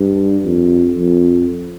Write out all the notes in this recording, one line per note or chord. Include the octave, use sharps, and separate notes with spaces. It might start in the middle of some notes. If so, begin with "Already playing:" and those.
Already playing: G2
F2
F2